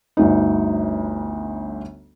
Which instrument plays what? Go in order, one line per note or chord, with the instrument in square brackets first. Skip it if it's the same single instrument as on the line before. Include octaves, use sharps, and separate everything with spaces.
[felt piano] G1 D2 D#4